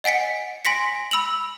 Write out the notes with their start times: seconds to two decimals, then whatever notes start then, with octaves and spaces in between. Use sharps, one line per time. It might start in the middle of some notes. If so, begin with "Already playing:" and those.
0.04 D#5 F#5 G#5 B6 C#7
0.65 G#5 C6 A#6 B6 C#7
1.11 B5 E6 F7 F#7